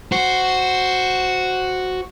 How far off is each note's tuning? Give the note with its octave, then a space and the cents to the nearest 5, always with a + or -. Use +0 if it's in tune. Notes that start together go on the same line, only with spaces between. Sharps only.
F#4 +0 C5 +0